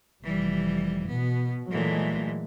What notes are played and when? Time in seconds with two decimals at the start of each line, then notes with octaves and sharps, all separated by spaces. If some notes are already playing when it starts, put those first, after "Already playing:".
0.23 F1 E3 G3
1.08 B2 B3
1.71 A#2 E3 F#3 G#3 A3